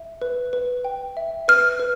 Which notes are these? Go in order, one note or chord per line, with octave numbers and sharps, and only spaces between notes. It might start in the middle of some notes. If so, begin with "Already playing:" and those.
Already playing: E5
B4
B4
G5
E5
B4 F6
B4